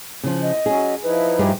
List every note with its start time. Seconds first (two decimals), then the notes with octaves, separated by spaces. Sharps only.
0.23 C#3 F3
0.42 D#5
0.66 F#3 C#4 G#4
1.03 F3 D#4 E4 B4
1.39 G2 G4 G#4